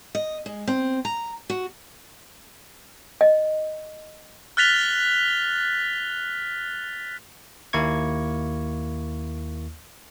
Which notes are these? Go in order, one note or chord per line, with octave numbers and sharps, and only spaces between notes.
D#5
G#3
C4
A#5
F#4
D#5
F6 F#6 A6 B6 F7 G7
D#2 A#3 E4 C#6 G#6